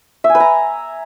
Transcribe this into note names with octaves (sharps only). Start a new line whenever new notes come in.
E5
G#5
B4
A#5